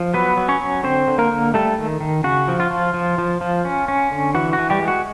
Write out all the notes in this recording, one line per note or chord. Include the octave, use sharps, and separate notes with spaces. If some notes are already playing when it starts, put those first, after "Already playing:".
Already playing: F3
F#3 B3 B4
F#3
C#4 C#5
F#3
D3 C4 C5
D3
A#3 A#4
D3
G3 A3 A4
D#3
D#3
C#3 F#4
F3
F4
F3
F3
F3
F3
C#4
C#4
D3
E3 F#4
F#4
E3
G3 G4
G#3
F#4